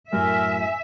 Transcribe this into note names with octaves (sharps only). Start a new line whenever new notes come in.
F#2 A2 A#4 E5 G#5